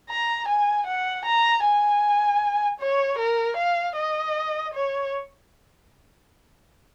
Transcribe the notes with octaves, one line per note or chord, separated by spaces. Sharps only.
A#5
G#5
F#5
A#5
G#5
C#5
A#4
F5
D#5
C#5